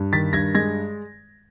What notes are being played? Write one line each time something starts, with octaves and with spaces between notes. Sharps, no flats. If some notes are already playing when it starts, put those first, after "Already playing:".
Already playing: G2
D#3 A6 B6
G2 G#6 A#6
G#3 G#6 A#6